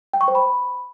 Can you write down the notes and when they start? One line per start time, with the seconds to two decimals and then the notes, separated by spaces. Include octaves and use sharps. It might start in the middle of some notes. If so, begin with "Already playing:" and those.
0.13 G5
0.21 C#6
0.28 C5
0.35 B5